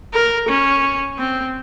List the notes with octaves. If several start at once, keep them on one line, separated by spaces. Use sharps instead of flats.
A#4
C#4
C4